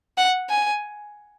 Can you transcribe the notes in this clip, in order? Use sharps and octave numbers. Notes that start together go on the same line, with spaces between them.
F#5
G#5